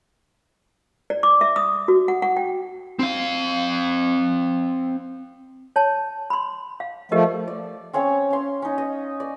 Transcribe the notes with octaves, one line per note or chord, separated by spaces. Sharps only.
D5
D6
E5
D#6
F#4
F#5
F#5
G5
C4 F5
C#5 A5
B5 C6
F5
F3 A3 G4 A#4 D#5
D5
C4 C#4 C#5 F5
C#4 C6
C#4 D#4
D#5
D5